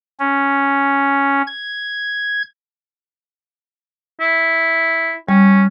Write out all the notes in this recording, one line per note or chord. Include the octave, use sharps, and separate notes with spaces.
C#4
G#6
E4
G3 C#4